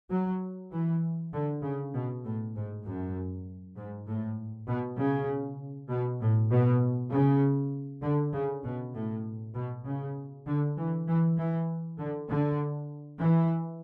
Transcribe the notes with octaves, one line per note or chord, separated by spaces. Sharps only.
F#3
E3
D3
C#3
B2
A2
G#2
F#2
G#2
A2
B2
C#3
B2
A2
B2
C#3
D3
C#3
B2
A2
B2
C#3
D3
E3
E3
E3
D3
D3
E3